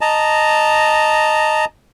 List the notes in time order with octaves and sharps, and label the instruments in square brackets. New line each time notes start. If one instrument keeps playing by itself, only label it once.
[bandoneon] D#5 A5 A#5